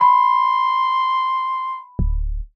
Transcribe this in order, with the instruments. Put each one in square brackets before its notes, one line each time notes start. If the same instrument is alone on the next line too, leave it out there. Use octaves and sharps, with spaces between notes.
[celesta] B5 [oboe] C6
[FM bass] D1